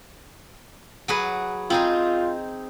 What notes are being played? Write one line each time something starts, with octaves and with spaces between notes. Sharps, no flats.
F#3 G#4 B4
C4 D#4 F4 G#4